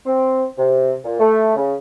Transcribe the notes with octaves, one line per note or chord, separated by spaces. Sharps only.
C4
C3
A#2
A3
C#3